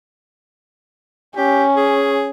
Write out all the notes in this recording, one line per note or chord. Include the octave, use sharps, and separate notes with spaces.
C#4 G4
G#4